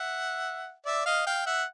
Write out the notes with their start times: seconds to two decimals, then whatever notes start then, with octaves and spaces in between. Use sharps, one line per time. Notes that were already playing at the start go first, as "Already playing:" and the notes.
Already playing: E5 F#5
0.86 D5 E5
1.06 D#5 F5
1.27 F5 G5
1.46 E5 F#5